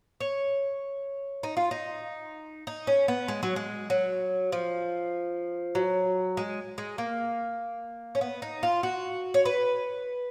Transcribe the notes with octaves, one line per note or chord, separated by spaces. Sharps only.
C#5
D#4
F4
D#4
D#4
C#4
B3
G#3
F#3
G#3
F#3
F3
F#3
G#3
G#3
A#3
C#4
B3
D#4
F4
F#4
C#5
B4